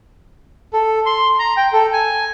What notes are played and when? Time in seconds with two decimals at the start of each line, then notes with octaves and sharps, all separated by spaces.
0.73 A4
1.06 C6
1.39 A#5
1.57 G5
1.73 A4
1.93 G#5